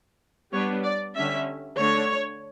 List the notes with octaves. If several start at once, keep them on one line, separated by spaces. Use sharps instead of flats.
G3 B3 D4 C#5
D5
D3 G3 C#4 E5
D3 A3 D4 C#5